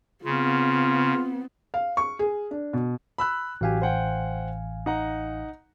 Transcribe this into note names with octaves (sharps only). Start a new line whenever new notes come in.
C#3 B3 C4 F4
F5
C#6
G#4
D4
B2
B5 E6 F#6
A1 F#3 G4 F5 G#5
C5 F#5 G5
D#4 F#5 A#5